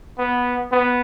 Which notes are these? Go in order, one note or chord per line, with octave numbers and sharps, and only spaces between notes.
B3
B3